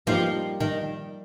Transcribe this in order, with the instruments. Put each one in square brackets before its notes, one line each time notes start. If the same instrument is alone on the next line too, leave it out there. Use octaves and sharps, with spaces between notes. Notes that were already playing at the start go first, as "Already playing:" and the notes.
[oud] F3 [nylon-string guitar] G3 A#3 D#4 G4
[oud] D#3